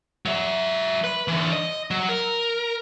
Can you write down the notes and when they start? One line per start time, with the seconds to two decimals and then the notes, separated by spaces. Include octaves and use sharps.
0.26 F#3 E5
1.04 B4
1.28 D3 E3
1.53 D#5
1.91 F#3
2.09 A#4